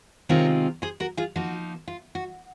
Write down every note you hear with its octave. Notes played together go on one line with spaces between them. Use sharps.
C3 D#3 G#3 C4 F4 A#4 C#5
G#4 C5
F#4 A#4
F4 G#4
F3 A#3 D#4 F#4
F4
F#4